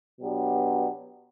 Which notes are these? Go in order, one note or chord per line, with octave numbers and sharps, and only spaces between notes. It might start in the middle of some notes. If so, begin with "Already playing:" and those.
B2 F#3 B3 D4 G4